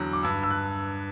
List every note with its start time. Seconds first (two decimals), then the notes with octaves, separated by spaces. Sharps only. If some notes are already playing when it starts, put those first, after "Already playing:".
Already playing: E2 D3 F#3
0.13 D6
0.23 G2 E6
0.43 E6
0.50 F#6